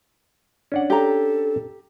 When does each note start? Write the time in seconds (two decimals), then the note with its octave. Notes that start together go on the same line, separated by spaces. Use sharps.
0.72 C#4 D4 F#5
0.90 G4 A4 A#5